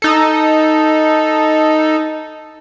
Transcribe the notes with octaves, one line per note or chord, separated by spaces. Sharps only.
D#4 A4